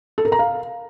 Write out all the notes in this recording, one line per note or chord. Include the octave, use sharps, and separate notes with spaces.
A4
A#4
A#5
F5